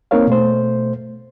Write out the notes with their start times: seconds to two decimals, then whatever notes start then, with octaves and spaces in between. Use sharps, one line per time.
0.11 A#3 C4 D#4 A#4 C#5 F5
0.27 B2 A3 C5